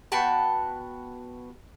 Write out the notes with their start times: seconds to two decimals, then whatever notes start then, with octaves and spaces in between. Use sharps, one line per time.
0.12 B3 F#4 G5 A5